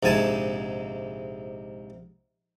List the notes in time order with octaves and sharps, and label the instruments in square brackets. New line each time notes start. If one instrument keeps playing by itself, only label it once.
[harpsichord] A#1 G#2 C3 G#5 A5